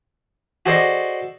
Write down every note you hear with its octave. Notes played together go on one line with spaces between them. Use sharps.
F#4 G#4 A4 C5 D5 D#5